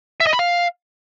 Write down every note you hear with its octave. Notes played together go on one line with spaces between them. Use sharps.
E5
D#5
B5
F5